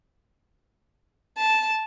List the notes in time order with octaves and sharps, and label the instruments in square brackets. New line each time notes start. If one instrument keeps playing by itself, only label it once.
[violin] A5